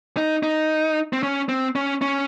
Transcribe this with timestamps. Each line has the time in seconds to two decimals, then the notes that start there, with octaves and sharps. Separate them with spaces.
0.17 D#4
0.43 D#4
1.13 C4
1.23 C#4
1.49 C4
1.75 C#4
2.02 C#4